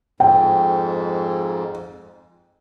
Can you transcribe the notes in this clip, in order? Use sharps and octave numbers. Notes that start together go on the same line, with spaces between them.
F2 G#2 G5